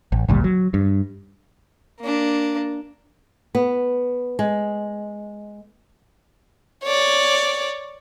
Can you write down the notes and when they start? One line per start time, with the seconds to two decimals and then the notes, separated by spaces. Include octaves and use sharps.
0.12 A1
0.28 G#1 D2 A#2 G3
0.44 F#3
0.74 G2
2.00 A#3 D4
3.55 B3
4.39 G#3
6.84 C#5 D5